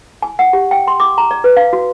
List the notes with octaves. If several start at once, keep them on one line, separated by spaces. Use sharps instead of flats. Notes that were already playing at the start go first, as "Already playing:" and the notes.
G#5
F#5
G4
G5
C6
D6
A#5
D5
B4
F5
F#4